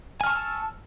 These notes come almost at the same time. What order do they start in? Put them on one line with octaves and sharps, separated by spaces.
G#5 F6 C#6 A5 E6